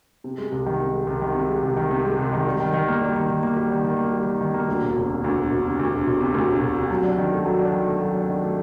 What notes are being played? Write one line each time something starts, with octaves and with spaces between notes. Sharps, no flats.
C3
G#3
C2
D#3
C3
G#3
C2
D#3
C3
G#3
C2
D#3
C3
G#3
C2
D#3
G3
D#3
D#3
A#3
G3
D#3
D#3
A#3
G3
D#3
D#3
A#3
G3
D#3
D#3
A#3
D2
E1
E1
C3
D2
E1
E1
C3
D2
E1
E1
C3
D2
E1
E1
C3
F#3
D4
D#3
A3
F#3
D4
D#3
A3
F#3
D4
D#3
A3